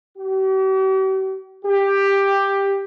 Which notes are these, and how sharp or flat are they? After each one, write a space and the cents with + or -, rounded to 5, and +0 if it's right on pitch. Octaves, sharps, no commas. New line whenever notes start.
G4 -45
G4 +10